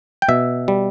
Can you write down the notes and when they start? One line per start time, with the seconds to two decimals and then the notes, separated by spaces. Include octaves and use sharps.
0.22 G5
0.28 B2 E5
0.68 G3